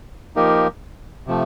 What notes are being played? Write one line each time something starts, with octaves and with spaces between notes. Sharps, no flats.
F3 A#3 D#4 G4 A#4
C3 F3 A3